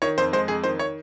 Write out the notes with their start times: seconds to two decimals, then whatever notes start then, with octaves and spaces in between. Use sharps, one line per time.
0.02 D#3 C#5
0.18 F2 C5
0.33 G#3 C5
0.48 F2 G#4
0.64 D#3 C5
0.79 C#5